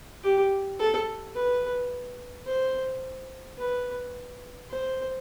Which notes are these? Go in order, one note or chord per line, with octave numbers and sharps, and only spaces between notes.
G4
A4
B4
C5
B4
C5